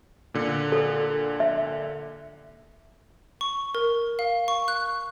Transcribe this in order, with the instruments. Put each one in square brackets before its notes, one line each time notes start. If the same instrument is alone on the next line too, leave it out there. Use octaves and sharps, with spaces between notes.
[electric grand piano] A#2 D3
[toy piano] A4
E5
[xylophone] C#6
A#4
F5
C#6
F#6